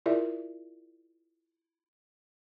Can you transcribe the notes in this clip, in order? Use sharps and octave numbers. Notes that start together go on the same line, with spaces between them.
E4 F4 G#4 A#4 D5 E5